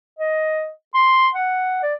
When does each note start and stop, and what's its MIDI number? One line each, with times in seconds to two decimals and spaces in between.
0.19 0.70 75
0.94 1.28 84
1.34 1.80 78
1.82 1.95 74